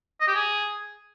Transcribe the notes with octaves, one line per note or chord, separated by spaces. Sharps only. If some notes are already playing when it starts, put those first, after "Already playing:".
D#5
G4
G#4